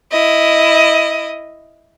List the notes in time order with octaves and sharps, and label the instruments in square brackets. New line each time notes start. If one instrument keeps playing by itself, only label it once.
[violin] E4 D#5